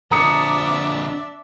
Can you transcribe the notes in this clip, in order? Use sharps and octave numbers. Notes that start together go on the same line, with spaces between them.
F2 D3 D4 E5 A#5 D#6 C#7